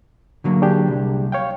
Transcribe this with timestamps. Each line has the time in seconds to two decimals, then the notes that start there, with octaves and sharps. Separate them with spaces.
0.44 D3 F#3 A#3
0.62 D4 G4 G#4
0.88 C2
1.32 C#5 F5 G5